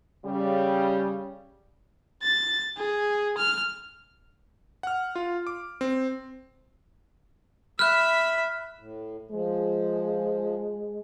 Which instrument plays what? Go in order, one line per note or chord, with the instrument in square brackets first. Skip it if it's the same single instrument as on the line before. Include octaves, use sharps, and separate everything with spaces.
[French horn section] C#3 G3
[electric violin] A6
G#4
F6
[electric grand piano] F#5 F6
F4
D6
C4
[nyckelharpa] E5 B5 [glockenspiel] F6 F#6
[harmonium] A2
[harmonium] F3 [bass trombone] G#3